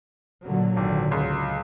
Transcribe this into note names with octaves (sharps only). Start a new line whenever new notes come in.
A#2 D3 F#3
G#1
C#2